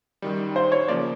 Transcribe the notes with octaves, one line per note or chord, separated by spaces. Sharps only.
F#2 D#3 G3
C5
C#5
C#3 F3 A#3 D5